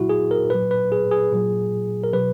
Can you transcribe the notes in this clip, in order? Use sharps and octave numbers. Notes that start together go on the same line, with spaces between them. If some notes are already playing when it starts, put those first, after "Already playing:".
Already playing: A#2 F#3 E4 F#4
G#4
A#4
A#2 F#3 B4
B4
G#4
G#4
A#2 F#3
A#4
B2 F#3 B4